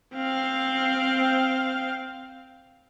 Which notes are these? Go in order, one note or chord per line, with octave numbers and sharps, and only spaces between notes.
C4 F5